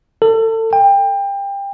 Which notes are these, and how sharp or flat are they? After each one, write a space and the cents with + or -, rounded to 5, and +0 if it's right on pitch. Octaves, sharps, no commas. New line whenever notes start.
A4 +30
G5 +25